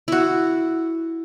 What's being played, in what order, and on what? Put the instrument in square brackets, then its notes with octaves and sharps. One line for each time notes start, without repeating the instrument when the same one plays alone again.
[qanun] E4 F#4